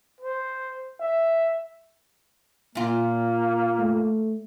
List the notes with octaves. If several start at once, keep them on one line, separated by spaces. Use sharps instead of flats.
C5
E5
A#2 A#3 F4
A3